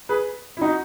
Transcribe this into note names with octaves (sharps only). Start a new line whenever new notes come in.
G#4 B4
E4
D#4 F#4